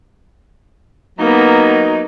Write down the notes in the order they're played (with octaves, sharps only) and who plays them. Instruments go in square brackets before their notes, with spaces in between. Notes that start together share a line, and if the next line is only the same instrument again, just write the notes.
[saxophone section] F#3 D#4 [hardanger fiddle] A#3 B3